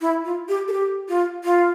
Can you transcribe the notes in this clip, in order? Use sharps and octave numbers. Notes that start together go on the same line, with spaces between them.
E4
F4
G4
A4
G4
F4
F4